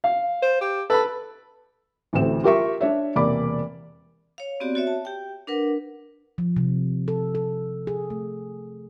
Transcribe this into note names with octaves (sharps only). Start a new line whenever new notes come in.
F5
C5
G4
A4 B4 B5
A1 D2 A2 E3 C4 E7
F4 G4 A#4 E5 C#6
D4 C#5 E5
E1 C3 A#3 D5 B5 D6
C#5 F5
B3 C4 F#4 G4 D5
F#4 C#5 E5
A5
G4 G5
D4 A#4 B4 F#5
F3
C3
A4
A4
G#4
A3